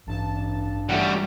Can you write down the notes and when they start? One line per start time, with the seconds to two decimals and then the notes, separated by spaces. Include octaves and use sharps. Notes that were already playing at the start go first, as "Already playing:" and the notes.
0.06 A1 G2 A5
0.89 E3 G3 A3 C#4 F#4